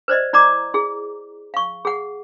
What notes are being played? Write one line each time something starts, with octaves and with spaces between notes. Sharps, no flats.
B4 C5 D5 D#5
E4 D5 A#5 D6
E4 G#4
F5 C#6
G#4 F#5